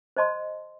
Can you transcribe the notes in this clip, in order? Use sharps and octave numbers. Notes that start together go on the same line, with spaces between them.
C5 D#5 A5 C6